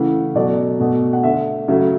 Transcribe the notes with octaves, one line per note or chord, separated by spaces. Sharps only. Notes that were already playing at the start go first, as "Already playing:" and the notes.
Already playing: C#3 E3 A3 F#5
B2 F#3 A3 D5
B2 A3
F#5
D3 A3 E5
C#3 F#3 A3 E5